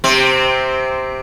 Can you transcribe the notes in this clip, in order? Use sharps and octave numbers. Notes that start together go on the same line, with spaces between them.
C3 C4